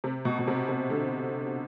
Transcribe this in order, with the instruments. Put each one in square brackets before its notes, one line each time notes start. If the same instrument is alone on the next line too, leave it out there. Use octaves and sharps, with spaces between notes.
[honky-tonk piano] C3
B2
B2
C3
C3
D3